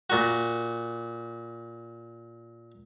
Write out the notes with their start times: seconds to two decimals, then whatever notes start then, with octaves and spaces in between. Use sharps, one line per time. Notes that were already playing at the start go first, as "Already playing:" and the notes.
0.10 A#2 F#4